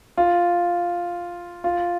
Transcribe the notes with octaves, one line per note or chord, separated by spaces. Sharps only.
F4
F4